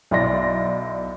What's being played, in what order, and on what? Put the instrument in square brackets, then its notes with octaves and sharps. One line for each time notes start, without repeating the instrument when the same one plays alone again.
[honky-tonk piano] B1 E4 D5 C6 A#6